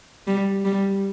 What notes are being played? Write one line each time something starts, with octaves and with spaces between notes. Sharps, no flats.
G3
G3